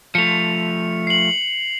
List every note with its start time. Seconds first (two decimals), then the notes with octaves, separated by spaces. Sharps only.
0.15 F3 A3 C#7 F7
1.07 C7 F#7